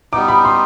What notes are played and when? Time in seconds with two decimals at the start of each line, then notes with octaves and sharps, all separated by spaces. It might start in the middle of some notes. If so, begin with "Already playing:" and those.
0.13 G3 B3 D#4 D6
0.28 B5
0.45 C6